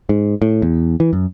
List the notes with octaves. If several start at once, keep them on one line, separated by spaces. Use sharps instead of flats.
G#2
A2
E2
E3
F#2